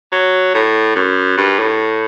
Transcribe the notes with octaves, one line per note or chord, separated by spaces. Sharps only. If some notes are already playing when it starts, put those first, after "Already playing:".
F#3
A2
F#2
G2
A2